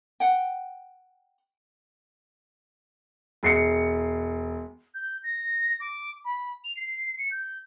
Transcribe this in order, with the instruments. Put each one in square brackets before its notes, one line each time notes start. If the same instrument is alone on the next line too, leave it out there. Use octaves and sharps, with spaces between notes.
[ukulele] F#5 G5
[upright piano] E1 C7 C#7
[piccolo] G6
A#6
D6
B5
F7
C7
C#7
G6